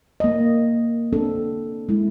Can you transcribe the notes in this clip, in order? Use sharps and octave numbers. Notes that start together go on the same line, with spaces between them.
A#3 D#5
C4 D4 A4
G#3 E4